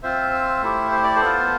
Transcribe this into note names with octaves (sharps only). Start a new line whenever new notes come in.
C4 F4 C5 E5
A3 E4 G4
C5
D5
A4 C5
B3 F4